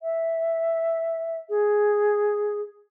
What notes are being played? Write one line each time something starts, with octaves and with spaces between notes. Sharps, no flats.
E5
G#4